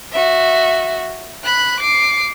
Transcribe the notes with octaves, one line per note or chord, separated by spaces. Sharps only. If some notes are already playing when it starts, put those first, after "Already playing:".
F#4 E5
B5 F#6
D6 C7